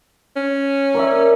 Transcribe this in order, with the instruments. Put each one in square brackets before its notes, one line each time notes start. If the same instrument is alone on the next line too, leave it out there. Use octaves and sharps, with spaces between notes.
[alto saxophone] C#4
[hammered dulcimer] A#4 D5 E5